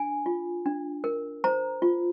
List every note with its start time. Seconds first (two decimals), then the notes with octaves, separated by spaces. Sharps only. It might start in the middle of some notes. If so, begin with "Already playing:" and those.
Already playing: D4 G#5
0.26 F4
0.66 D4
1.04 A#4
1.44 C5 A#5
1.82 F4